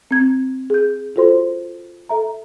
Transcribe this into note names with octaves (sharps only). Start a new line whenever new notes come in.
C4 G#6
G#4 G6
F4 F#4 A4 C5 C6
A4 E5 A#5